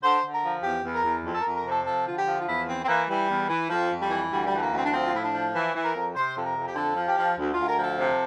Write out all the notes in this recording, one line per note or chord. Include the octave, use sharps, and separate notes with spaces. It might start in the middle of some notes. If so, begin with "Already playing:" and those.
D3 C5
D3
A#4
F3
E2 G4
E2
A#4
E2
F2
A4
F2 A#4
A#4
C3
A4
F3 A4
D3 F4
G4
F3
F4
E2 E4
E3 C4
C4
E3 A#3
E3 G3
E2
E3
F2 F3
F2
G3
E3
D2 G3
G3
E3
A3
A#3
D2
C4
D4
F3 C4
F4
A2 E4
D4
F3
E3
E3
A#4
F2
C3 C5
F2 A4
A#4
F2
G4
D3 A4
F3
G4
F3
D2
F4
D2
A#4
F3
A4
C3